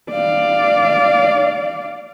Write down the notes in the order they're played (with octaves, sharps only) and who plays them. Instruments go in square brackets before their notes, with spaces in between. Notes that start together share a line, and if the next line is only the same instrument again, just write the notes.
[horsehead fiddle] D5 F5